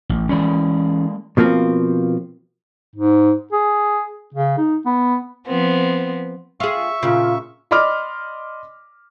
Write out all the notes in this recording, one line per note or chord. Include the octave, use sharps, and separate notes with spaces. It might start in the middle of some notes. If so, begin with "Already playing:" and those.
A1
E3 G#3 A#3 C#4 D5
B2 F3 A#3 C4
G#2
G#4
C#3
D#4
B3
F3 B3 C4
F4 G#4 E5 C#6
A#2 C#3 F4
D5 D#5 B5 C6 D6 F6